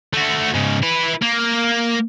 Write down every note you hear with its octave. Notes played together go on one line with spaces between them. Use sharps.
A3 F#4
G#2 C#3
E4 B4
A#3